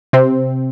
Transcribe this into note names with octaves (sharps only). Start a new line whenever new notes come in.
C3 C4